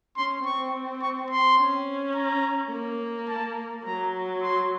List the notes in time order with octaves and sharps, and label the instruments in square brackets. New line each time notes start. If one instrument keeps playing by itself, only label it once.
[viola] C#4 [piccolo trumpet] C6
[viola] C4 [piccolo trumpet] C#6
[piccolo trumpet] C#6
C6
[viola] C#4
[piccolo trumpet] A#5
[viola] A#3
[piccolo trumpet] A5
[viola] F#3 [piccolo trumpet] A#5
[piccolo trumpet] C6